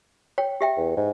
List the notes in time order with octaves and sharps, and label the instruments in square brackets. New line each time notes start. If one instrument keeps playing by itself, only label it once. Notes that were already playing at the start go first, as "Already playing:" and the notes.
[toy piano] C#5 G5
G4 E5 G5
[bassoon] E2
G#2